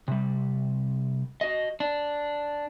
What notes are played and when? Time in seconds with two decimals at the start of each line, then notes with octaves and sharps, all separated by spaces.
0.08 C3 G3
1.41 F#4 D#5
1.80 D4